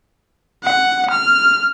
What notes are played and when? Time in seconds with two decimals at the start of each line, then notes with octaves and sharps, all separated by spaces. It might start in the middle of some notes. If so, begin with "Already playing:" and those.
0.64 F#5
1.11 F6